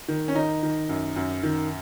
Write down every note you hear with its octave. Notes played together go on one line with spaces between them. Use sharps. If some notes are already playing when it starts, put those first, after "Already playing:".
D#3
C#4
D#3 D#4
D#3
F#2
F#2
D#3